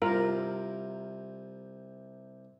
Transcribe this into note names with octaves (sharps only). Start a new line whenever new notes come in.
C2 C3 F4 A#4